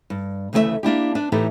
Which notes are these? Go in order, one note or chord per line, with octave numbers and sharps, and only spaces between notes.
G2
D2 C#3 E3 A3 A#4 E5
A#3 D4 E4 G4
D4 B4
A2 E3 D#4 E4 G4 A4